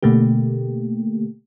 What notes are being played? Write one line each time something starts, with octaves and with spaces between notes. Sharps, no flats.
B2 D3 A3 A#3 G4